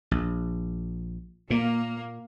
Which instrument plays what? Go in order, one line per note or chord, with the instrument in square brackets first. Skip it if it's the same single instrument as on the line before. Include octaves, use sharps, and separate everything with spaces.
[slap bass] A#1
[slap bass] A#2 [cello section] A#3